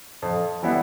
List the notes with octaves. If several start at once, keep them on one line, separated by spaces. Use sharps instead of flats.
F2
E3 G3 B3 E4